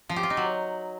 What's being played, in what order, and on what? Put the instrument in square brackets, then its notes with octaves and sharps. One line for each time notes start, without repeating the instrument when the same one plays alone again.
[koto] F3
G4
F4
D#4
F#3